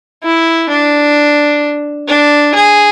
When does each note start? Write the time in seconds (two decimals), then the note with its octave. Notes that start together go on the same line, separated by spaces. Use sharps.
0.23 E4
0.69 D4
2.08 D4
2.55 G#4